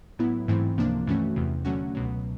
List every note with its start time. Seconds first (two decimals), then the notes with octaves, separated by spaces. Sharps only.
0.19 A2 F#3 B3 E4
0.48 G#2 E3 A3 C4 E4
0.78 C#2 C3 F3 A#3 D4
1.07 G2 E3 A3 C#4 F#4
1.36 E2 C3 E3
1.65 D3 F#3 A3 C#4 F#4
1.95 C#2 B2 F#3